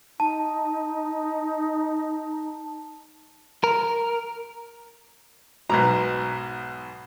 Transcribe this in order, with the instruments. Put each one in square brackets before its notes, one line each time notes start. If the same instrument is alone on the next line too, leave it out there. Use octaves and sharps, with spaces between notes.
[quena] D#4 [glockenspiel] A5
[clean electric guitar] A#4
[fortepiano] B1 G#2 B2 [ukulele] A#5